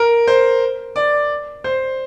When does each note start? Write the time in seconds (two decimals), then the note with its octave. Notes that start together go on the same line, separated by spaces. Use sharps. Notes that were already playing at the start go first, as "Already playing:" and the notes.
Already playing: A#4
0.27 C5
0.96 D5
1.64 C5